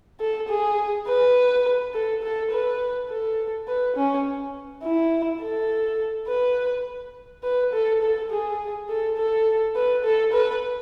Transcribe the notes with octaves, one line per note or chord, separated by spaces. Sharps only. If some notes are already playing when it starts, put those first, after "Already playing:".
A4
G#4
B4
A4
A4
B4
A4
B4
C#4
E4
A4
B4
B4
A4
A4
G#4
A4
A4
B4
A4
B4